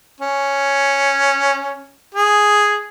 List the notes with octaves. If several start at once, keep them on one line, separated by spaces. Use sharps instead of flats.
C#4
G#4